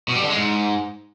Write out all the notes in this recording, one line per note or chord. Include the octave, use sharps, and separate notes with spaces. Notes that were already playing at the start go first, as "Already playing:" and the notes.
B2
G3
D3
G#3
G#2